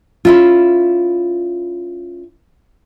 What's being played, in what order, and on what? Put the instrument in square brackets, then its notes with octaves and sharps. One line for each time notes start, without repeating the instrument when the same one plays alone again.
[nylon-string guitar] C#4 E4 F4